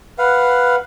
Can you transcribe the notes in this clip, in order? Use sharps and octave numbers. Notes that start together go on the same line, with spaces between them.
B4 F5 F#5